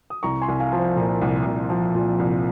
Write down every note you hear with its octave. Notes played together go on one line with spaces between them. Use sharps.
D#6
C2 A#5 C#6
G#5 C6
C2
F5 G#5
F3
C5
A#2 A#4
C2
C2
F3
A#2
C2